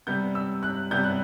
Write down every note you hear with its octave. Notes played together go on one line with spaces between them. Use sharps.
C3 G3 B3 G6
E6
F#6
C3 G3 B3 G6
F#6